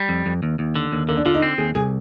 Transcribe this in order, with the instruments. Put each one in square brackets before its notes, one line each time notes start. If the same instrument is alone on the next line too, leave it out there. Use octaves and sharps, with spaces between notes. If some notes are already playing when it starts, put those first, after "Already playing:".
Already playing: [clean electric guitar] G3
F2
F2
D#2
D#2
D3
D#2
[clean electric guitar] D3 [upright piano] A#3
[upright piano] D4
[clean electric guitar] D3 [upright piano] F4
[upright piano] D#4
[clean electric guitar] C4
[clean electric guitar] D#2 [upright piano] G#4
[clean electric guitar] C2 [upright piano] G#4